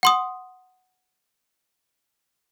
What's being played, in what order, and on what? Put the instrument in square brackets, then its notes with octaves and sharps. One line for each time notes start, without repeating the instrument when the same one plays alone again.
[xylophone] F#5 C6 D#6